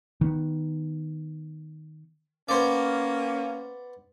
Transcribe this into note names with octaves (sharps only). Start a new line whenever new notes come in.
D#3 B3
A#3 B3 C#4 C5 D5